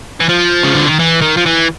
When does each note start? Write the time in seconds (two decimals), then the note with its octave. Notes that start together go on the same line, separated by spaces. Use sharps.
0.20 E3
0.29 F3
0.63 C#3
0.75 D3
0.87 D#3
0.99 E3
1.21 D#3
1.37 F3
1.46 E3